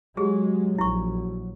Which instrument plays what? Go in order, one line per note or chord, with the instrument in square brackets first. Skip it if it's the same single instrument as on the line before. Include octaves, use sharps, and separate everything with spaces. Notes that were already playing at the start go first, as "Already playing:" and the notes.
[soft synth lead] F#3 [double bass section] G#3 [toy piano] G4 G#4
[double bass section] A#1 [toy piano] E4 C#6